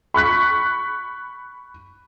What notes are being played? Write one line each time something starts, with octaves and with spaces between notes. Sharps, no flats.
B5 C#6 F#6 B6